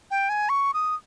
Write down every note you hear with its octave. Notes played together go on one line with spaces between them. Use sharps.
G5
G#5
C#6
D#6